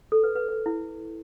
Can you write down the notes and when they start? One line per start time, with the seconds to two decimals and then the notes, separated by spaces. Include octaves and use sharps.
0.12 A4
0.23 B4
0.35 B4
0.49 B4
0.66 E4